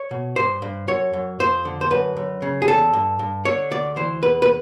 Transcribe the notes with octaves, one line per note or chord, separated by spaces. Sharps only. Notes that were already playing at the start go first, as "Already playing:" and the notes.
Already playing: C#5
B2
G2 C5
G2
F#2 C#5
F#2
F2 C5
D3
C5
F#2 B4
F#2
C#3
G#4
E2 A4
G2
G2
D3 C#5
D2 D5
E3 C5
E2 B4
B4